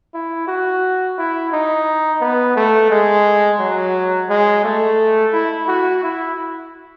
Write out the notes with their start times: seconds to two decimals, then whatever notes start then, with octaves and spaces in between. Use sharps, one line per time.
0.14 E4
0.48 F#4
1.18 E4
1.52 D#4
2.21 B3
2.56 A3
2.90 G#3
3.59 F#3
4.29 G#3
4.64 A3
5.33 E4
5.68 F#4
6.03 E4